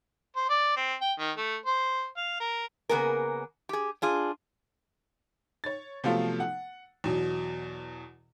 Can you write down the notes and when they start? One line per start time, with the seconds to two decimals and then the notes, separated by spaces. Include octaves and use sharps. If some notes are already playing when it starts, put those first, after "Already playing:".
0.36 C5
0.50 D5
0.77 C4
1.01 G5
1.19 D#3
1.37 A3
1.66 C5
2.17 F5
2.40 A#4
2.89 C#3 A#3 B3 G#4 A#4
3.69 G4 G#4
4.02 D4 F4 G#4
5.64 C#5 A6
6.04 C3 F3 F#3 A3 B3 F4
6.40 F#5
7.04 E2 B2 F#3